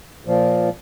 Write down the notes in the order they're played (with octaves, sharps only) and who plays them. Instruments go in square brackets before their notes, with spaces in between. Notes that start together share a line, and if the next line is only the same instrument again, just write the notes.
[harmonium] A#2 F3